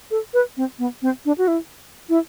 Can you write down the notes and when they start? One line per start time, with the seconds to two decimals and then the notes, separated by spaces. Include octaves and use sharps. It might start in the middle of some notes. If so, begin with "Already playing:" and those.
0.11 A4
0.34 B4
0.57 C4
0.79 B3
1.02 C4
1.25 D4
1.38 F#4
1.48 E4
2.09 E4